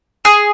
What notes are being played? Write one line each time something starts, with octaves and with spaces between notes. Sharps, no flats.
G#4